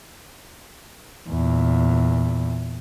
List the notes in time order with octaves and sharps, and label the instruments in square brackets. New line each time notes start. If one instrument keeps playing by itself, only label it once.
[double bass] E2 A#2